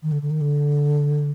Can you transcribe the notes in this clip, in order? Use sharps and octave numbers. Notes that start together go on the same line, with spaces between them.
D#3
D3
D3
D#3
D3